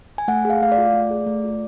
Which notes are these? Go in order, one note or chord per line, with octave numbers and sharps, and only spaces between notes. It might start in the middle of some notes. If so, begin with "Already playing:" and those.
G#5
A3 F#5
G#4 F5
A3 F5
D5
F4
A3
G#4
A3
F4